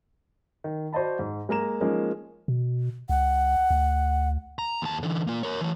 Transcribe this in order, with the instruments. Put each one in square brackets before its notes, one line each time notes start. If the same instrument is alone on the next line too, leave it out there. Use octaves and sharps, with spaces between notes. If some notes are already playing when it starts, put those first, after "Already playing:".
[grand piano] D#3
F#4 C5 D5 D#5 A5 B5
G#2
G#3 A#3 A#5 E7
F3 G#3 A#3 C#4 D#4
[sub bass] B2
[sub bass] C#2 [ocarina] F#5
[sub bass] D2
[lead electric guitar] A#5
D#2 A5
D3 E3
A#3 F4
A#4 C#5
E3 C#5